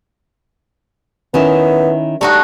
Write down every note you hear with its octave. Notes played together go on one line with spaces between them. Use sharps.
D#3 B3 C#4 E4
G3 A3 D#4 F#4